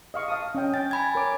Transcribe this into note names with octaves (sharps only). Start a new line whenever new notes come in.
D#5 F5 C#6
F5 A5 D#6
C#4 D#5 G5
G5 A6
G#5 B5 G#6
A#4 C#5 D6